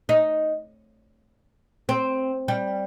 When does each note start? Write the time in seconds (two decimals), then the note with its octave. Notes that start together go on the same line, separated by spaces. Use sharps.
0.09 D#4
1.89 C4
2.48 G3